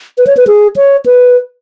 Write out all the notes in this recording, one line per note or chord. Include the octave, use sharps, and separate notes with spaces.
B4
C#5
B4
G#4
C#5
B4